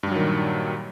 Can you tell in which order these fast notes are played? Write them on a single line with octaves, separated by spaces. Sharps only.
G2 G3 F#3 D#3 A#2